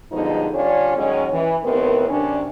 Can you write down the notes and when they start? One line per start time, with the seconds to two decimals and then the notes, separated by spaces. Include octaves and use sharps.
0.12 G2 B2 D3 F3 G#3 D#4
0.54 D3 G3 C#4 D4 F4 C#5
0.96 D#3 F#3 G#3 C#4
1.32 E3
1.63 D#2 A2 B3 C4 A#4
2.09 F#2 C3 C#4 D4